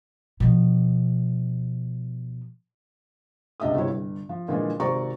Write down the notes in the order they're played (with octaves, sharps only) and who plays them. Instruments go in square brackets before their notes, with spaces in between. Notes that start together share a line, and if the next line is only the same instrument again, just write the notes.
[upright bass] B2 F3
[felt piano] C#2 C3 D4 D#5 E5 D#6
G1 C3 E4 C#5
G1
F3
A#2 D3 E3 F3 G#3
G#1 C3 C5 D5 A#5 C#6